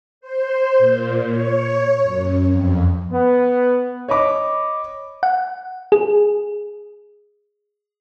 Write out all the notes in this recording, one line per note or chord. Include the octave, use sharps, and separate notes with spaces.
C5
A#2
C#5
F#2
F2
B3
C#5 D#5 B5 D6
F#5
G#4